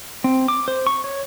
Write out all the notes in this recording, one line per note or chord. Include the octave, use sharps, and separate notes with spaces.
C4
D6
C5
C#6
C#5